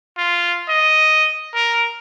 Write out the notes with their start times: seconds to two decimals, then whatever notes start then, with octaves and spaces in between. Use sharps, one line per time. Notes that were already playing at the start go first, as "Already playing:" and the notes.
0.18 F4
0.69 D#5
1.54 A#4